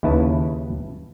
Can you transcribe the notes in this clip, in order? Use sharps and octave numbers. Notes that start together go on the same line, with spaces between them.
D#2 C#3 E4 B4 A5